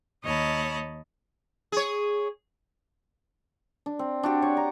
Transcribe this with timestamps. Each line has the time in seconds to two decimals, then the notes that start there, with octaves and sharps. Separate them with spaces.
0.23 D#2 C#5 D#5 A5 B5
1.72 G#4 C#5
3.86 D4
3.99 C4
4.23 D4 F#4 G4 F#5
4.42 C#5 D5 C#6
4.57 A#5